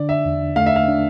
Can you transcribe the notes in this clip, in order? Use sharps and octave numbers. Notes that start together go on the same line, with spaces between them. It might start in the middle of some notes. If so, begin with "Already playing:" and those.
Already playing: D3 D4 D5
E5
E2
A3 F5
E5
F5
D4